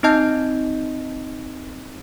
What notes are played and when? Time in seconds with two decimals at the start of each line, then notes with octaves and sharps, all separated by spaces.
0.03 C4 D#4 D#5 A5 G6